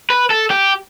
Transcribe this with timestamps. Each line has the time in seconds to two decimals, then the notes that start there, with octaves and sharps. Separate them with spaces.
0.10 B4
0.30 A4
0.50 G4